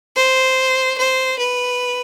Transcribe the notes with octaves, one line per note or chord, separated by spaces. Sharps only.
C5
C5
B4